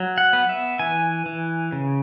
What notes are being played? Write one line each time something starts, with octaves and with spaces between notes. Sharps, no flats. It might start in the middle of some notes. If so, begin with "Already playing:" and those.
Already playing: F#3
F#5
B3
E5
E3 G#5
E3
C#3